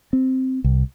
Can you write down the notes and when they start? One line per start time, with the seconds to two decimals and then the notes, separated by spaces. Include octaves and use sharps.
0.13 C4
0.64 C2